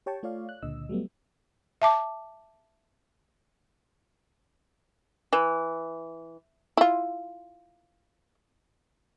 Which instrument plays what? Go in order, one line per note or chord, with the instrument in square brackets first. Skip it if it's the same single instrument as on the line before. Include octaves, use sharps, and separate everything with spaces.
[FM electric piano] G4 C#5 G5 A5 C#6
A3 F4 C#5 D5 F5
F#6
C#2 A#2 D3 D#5 E6
F#3 G3 A3 B3
[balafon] E5 A5 D6
[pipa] E3
[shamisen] E4 F4